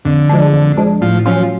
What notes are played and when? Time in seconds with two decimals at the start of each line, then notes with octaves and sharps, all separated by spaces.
0.05 F2 D3
0.29 F3 G#3 D4
0.53 F2
0.77 F3 G#3 D4
1.01 A2 F3
1.26 F3 F#3 C#4 F4